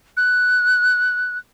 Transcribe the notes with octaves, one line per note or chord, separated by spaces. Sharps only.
F#6